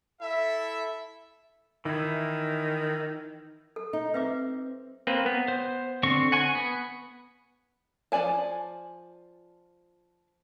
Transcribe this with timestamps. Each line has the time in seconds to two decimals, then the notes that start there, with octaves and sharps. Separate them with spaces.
0.20 E4 A4 E5
1.85 D#3 E3 E4
3.76 A4
3.93 D#4
4.14 C4 B4 E5 D6
5.07 A#3 C4 B4
5.26 B3
5.48 C5
6.03 D3 C4 C#6
6.32 F#5 G#5 C#6
6.55 B3
8.12 F3 E4 D5 G#5 A5